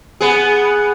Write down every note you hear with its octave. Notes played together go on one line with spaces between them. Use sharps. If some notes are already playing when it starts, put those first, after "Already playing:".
B3 G#4